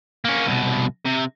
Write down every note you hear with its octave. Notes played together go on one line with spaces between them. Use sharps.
A#3 C#4
C2 B2
C3